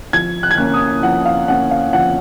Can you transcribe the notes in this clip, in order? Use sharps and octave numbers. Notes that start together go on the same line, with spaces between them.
F3 G#6
F#6
G#6
A#3 C#4 F#6
D#6
F3 F#5
F5
A#3 C#4 F#5
F5
F3 F#5